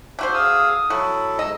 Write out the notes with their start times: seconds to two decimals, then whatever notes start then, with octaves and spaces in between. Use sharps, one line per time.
0.19 D3 F#4 C5 E5
0.33 G#4 F5 D#6 E6
0.90 F#3 E4 F#4 A4
1.39 G#2 D#5 E6